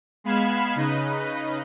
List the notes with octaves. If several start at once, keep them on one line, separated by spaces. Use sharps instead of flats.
G#3 B3 F5 B5 G#6 E7
C#3 D#4 B4 D#5